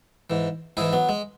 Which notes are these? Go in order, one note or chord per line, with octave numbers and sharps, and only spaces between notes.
G#2 E3
G#2 E3 E4 G#4
F#3 B3
G#3